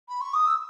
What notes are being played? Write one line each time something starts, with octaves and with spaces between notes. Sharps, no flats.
B5
C#6
D#6
E6